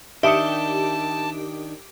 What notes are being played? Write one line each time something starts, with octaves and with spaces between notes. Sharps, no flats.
D#3 D4 G4 E5 A5 D#6 C#7